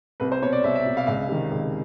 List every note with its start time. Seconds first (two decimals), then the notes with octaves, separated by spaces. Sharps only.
0.20 C2 B4
0.32 C5
0.42 B2 C#5
0.52 D5
0.64 C2 E5
0.75 E5
0.86 B2
0.97 F5
1.07 C#2 F5
1.29 C3 D#3
1.51 C#2